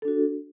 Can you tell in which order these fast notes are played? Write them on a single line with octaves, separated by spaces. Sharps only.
A4 D4 F#4